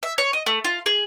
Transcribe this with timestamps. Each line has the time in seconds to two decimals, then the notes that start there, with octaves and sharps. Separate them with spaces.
0.03 E5
0.18 C#5
0.33 D#5
0.46 A3
0.64 F4
0.86 G#4